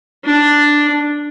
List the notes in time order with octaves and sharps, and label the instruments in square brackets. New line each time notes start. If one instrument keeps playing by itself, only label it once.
[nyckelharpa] D4